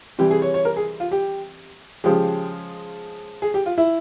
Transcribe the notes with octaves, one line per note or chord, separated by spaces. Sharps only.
C3 E3 G3 G4
G#4
C#5
C#5
A#4
G#4
F4
G4
C#3 F3 G#3 G4
G#4
G4
F4
E4